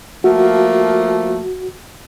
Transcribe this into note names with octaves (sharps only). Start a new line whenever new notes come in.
F3 A3 A#3 F#4